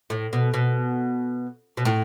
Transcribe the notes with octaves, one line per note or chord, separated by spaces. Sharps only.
A2
B2
B2
B2
A2